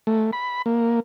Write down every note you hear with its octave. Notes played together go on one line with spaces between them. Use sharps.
A3
B5
A#3